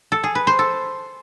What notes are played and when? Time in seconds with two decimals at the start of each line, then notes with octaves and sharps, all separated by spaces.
0.12 A4
0.24 G#4
0.35 B4
0.47 C5
0.59 A4